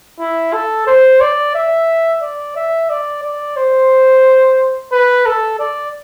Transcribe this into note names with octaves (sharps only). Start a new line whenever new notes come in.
E4
A4
C5
D5
E5
D5
E5
D5
D5
C5
B4
A4
D5